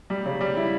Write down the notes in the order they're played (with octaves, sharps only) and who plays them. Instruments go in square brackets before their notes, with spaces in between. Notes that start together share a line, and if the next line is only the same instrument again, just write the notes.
[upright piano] G3
C#3
G3
E4